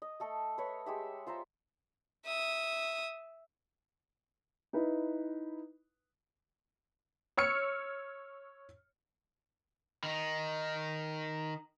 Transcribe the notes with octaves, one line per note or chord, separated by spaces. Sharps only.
D#5
A3 A4 D#5
B4 C#5
G#3 G4 E5
F4 C5 E5 A#5
E5 D#6
D#4 E4 B4
C#5 E6 F6 C#7
D#3 D#4